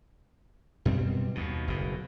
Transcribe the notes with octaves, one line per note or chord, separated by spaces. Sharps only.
F#2 B2 G3 C4
D#2 B2
F#1 B2